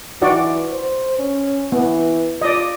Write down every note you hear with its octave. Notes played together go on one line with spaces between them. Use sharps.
E3 D#4 F#4 D5
C5
C#4
E3 B3
F4 D5 D#5